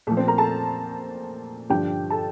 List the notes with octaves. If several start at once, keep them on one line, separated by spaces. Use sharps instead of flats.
A#2 F3 A3 A4
C4 C5
A#4 A#5
A4 A5
G2 D3 F3 G4 G5
A4 A5